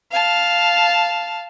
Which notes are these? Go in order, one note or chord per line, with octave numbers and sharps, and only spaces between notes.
F5 A5